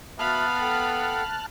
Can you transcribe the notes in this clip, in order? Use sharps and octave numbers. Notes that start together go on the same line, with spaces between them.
B3 F#4 E5 F5 A5 B5 F6 F#6
A4 F#5 G5